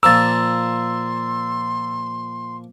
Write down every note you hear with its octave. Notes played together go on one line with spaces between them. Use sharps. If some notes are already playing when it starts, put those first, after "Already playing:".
A#2 F3 A#5 C6 D6 E6 A6